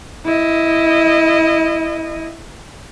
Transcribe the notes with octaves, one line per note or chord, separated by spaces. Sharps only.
E4 D#5